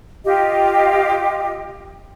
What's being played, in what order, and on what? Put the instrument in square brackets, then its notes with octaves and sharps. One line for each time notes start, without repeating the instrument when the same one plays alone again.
[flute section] F4 G4 D#5